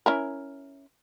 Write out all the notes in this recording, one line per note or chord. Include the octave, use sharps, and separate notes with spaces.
C#4 E4 A#4